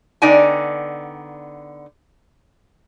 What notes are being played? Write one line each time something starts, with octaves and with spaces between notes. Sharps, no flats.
D3 B3 D#4 D5 G5 G#5